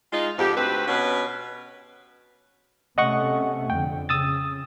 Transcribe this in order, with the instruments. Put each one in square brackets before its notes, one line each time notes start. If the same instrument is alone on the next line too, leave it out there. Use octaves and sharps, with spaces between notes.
[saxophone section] G#3 D#4 F4
F2 G#2 G4
D2 C4 B4
B2 C#4 B4
[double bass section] C3 A3 C#4 [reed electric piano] D#5 F#5 C#6
[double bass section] F2 D3 [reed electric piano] G5
[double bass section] C#3 [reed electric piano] D#6 E6 A6